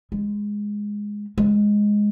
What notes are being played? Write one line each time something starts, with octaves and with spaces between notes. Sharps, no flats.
G#3
G#3